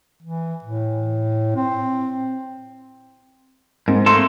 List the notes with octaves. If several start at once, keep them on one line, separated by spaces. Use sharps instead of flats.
E3
A2
C4
G#2 C4
A3 A#3 A4 C6